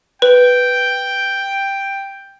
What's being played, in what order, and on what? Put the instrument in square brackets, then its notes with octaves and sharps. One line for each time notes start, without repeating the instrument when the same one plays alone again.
[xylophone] B4 [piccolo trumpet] G5